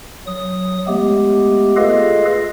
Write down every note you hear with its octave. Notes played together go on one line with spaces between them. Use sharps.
F#3 D#6
G#3 A3 B3 G4
F4 G#4 A4 B4 D#5 F5